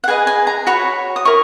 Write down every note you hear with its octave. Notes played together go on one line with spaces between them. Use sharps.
F#5
G#4 B4 D#5 G#5
G#5
A#5
F#4 C#5 B5
D#6
E4 A#4 C#6